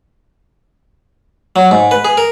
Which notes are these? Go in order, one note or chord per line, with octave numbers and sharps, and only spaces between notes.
F#3
G#2
B4
G#4
A#4